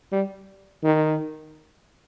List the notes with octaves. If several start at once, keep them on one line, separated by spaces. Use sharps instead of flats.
G3
D#3